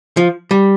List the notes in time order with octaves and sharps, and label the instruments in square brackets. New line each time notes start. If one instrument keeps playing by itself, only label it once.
[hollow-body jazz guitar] F3
G3